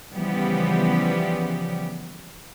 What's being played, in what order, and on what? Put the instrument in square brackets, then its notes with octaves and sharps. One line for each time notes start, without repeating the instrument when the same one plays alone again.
[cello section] C#3 E3 F3 G3 B3 G4